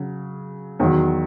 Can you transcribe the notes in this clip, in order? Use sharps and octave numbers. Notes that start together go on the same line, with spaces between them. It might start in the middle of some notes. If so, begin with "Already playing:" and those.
Already playing: C#3 F#3
E2 D#3 F#3